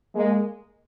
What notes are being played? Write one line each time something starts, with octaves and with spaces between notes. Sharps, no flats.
G#3 A#3